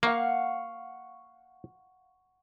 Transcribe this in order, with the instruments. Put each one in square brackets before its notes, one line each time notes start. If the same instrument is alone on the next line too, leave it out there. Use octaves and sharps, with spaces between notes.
[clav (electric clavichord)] A#3 [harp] F5 F#5 C#6